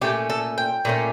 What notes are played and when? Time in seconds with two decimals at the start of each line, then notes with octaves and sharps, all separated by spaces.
0.02 A#2 A3 C#4 G4
0.30 A4
0.58 G5
0.85 A#2 A3 C#4